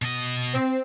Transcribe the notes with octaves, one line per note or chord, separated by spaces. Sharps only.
B2 D#5
C4